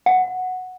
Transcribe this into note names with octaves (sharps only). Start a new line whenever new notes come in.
F#5